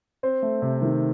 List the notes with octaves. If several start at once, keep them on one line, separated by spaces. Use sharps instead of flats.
C4 C5
A3
C3
D#3